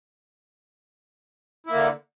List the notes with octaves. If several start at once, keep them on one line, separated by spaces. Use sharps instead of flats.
D3 A#3 E4